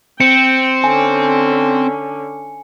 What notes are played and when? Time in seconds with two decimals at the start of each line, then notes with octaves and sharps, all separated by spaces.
0.20 C4 G5 C#7
0.84 D3 C#4 G#5